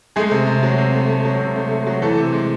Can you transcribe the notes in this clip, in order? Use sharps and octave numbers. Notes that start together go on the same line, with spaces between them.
G#3 A3 G#4
C3
C3
F#3
C3
A3
A3
F#3
C3
A3
A3
F#3
E3 A3 A4
C3
G#3